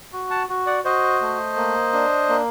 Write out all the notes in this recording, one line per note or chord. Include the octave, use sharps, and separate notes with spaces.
F#4
F#5 A5
F#4
D5 F#5
F#4 C5 D#5
A3
A#3
D4
A#3